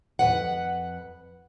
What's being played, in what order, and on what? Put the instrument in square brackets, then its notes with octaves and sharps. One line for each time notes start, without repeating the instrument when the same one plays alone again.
[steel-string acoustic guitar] F2 E3 B4 F#5